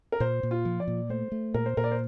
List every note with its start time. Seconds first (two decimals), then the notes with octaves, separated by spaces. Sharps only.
0.12 A#4
0.20 A#2 C5
0.43 A#2
0.51 F4
0.65 F3
0.80 D5
0.88 A#2
1.09 A3 C5
1.32 A3
1.54 A#2 A#4
1.66 C5
1.77 A#2 A#4
1.84 D5
1.91 C5